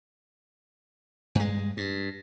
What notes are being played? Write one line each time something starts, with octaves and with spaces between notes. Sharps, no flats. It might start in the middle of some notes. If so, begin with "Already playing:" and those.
G2 G#3
G2